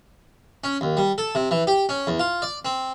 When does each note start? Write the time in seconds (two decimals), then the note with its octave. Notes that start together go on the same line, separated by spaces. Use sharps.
0.64 C#4
0.81 D#2
0.97 G3
1.18 A4
1.35 C3
1.51 E3
1.67 G4
1.89 C#4
2.07 E2
2.19 F4
2.42 D5
2.65 C4